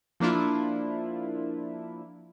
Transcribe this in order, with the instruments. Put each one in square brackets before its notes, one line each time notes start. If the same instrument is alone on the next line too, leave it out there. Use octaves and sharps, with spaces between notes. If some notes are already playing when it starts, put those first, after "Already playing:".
[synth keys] F3 A#3 D4 E4 F4